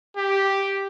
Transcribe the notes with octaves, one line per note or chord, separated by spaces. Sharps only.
G4